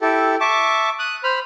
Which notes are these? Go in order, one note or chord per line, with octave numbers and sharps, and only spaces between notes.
E4 G4 A4
E5 A5 C#6 D6
D#6 F#6
C5 B5 F6